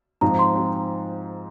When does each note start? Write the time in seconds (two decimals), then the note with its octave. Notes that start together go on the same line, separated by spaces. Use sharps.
0.21 G#2 F3 C4 A#5
0.39 C6
0.55 F3 C4